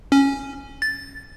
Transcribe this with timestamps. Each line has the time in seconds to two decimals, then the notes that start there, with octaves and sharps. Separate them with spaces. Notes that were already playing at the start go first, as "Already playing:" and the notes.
0.12 C#4
0.82 A6